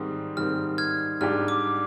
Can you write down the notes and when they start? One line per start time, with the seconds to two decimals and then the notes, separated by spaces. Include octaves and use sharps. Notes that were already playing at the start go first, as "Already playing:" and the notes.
Already playing: G#2 D#3 G3 C4 D#6
0.36 G#2 D#3 G3 C4 F6
0.78 F6 G#6
1.21 G#2 G3 D4 G4 F6
1.48 D6